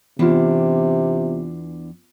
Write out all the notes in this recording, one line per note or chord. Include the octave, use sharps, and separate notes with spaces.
E2 C3 E3 B3 D4 F4